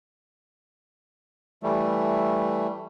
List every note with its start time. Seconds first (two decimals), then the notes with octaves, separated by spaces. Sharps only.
1.63 E3 G3 A3